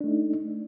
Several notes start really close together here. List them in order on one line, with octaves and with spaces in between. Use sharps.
D4 A3 D#4